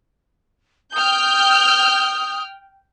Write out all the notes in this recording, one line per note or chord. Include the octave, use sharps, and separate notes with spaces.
G5 D#6 F6 G6